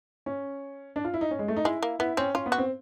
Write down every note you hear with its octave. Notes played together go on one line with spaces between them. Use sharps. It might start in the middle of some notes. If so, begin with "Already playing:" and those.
C#4
D4
F4
E4
D#4
C#4
G#3
A3
D#4
G#3 E4
A#3
B3 E4
C4 C#4
C#4 F4
B3
F#4
C4